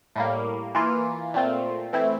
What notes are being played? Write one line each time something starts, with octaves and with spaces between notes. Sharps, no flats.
A2 G3 A#3
E3 A#3 F4
A#2 A3 C4 F4
E3 A3 C4 E4